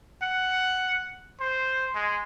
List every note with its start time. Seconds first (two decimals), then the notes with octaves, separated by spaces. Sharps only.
0.22 F#5
1.40 C5
1.95 G#3